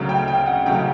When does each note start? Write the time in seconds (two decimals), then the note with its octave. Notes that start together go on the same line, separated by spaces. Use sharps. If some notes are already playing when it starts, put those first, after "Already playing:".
Already playing: D2 C#3 F#3
0.09 G5
0.28 G5
0.47 F#5
0.66 D2 C#3 F#3 G5